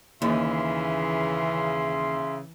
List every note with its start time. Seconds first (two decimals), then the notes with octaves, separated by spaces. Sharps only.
0.22 D#2 C#3 E3 E5 C6